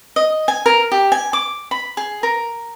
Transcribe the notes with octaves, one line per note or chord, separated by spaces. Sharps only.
D#5
G#5
A#4
G4
G#5
D6
B5
G#4
A#4